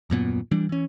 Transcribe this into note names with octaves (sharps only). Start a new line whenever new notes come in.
D#1 F#2 A#2 B3
E3 G3 D4
E3 C#4